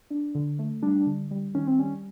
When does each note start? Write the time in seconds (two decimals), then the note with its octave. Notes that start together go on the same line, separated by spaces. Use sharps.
0.10 D4
0.35 D3
0.59 A3
0.82 G3 D4
1.06 D3
1.31 G3
1.54 D#3 C#4
1.67 C4
1.79 G3 C#4